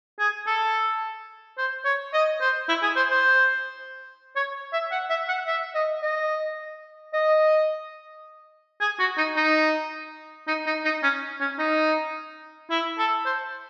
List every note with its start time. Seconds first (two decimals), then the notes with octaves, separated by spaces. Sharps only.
0.19 G#4
0.47 A4
1.57 C5
1.85 C#5
2.13 D#5
2.41 C5
2.69 E4
2.83 G#4
2.96 C5
3.11 C5
4.36 C#5
4.73 E5
4.91 F#5
5.09 E5
5.28 F#5
5.47 E5
5.74 D#5
6.02 D#5
7.13 D#5
8.81 G#4
8.99 F#4
9.17 D#4
9.36 D#4
10.47 D#4
10.66 D#4
10.85 D#4
11.03 C#4
11.40 C#4
11.58 D#4
12.70 E4
12.98 A4
13.26 C5